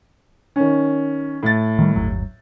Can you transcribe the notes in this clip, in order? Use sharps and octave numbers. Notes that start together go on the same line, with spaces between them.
D#3 C#4
A2 A6
D#3 G3
G1 D#2 F#3